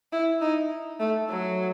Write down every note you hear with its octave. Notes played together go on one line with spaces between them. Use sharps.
E4
D#4
A3
F#3